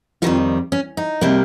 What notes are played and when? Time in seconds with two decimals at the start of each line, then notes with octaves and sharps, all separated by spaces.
0.22 F2 D#3 G3 F4
0.72 C#4
0.97 D#4
1.21 C3 G3 A#3